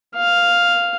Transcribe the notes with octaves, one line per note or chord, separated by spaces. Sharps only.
F5